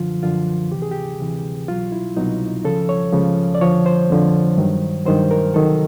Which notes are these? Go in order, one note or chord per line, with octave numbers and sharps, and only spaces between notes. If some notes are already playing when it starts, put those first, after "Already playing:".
Already playing: F#2 D3 F3 F4
F#2 D3 F3 F4
D2 C3 E3 G4
G#4
G4
D2 C3 E3
C2 B2 F#3 F4
E4
C2 B2 F#3 D#4
C#2 C#3 F3 A4
C#5
C#2 C#3 F3
D5
F2 D3 F3 C#5
C5
F2 D3 F3
G2 D#3 F#3
G2 D#3 F#3 C5
A#4
D2 C3 D#3 F#3 A4